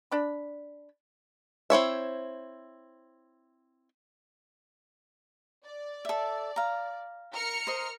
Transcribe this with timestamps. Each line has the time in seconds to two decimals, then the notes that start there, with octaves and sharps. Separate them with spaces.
0.11 D4 B5
1.70 C4 E4 C#5 E5
5.65 D5
6.05 A4 E5
6.56 F5 A#5
7.33 A#4 F6 C#7
7.67 C5 D#5